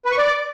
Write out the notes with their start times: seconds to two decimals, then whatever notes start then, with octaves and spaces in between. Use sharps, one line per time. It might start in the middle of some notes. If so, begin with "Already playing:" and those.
0.05 B4
0.12 C#6
0.18 D5